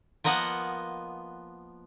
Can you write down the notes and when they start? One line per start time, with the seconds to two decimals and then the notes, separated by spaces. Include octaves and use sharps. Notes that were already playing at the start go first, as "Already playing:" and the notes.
0.24 F3 A#3 B3 D#5 F#5